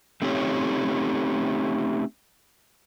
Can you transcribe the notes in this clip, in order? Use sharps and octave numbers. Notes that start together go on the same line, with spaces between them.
A3 C4 C#4 D#4 G4 C#5